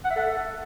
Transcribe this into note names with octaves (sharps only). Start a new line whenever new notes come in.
F#5
E5
A4